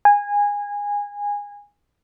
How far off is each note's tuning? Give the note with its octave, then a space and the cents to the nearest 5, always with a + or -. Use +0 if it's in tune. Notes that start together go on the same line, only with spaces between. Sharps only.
G#5 -20